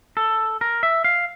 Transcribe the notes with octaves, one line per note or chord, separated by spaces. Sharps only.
A4
A#4
E5
F5